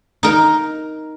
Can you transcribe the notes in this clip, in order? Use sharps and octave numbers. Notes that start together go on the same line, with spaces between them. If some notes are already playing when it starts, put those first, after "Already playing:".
D#4 A#4